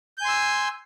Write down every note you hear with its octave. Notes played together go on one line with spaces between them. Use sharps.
G#5 C6 E6 G6